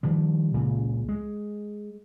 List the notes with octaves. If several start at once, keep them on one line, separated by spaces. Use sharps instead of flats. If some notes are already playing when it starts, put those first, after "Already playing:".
D#3 F3 G3
C#2 A#2 C#3
G#3